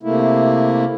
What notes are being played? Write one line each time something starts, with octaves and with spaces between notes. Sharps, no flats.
C3 A3 A#3 E4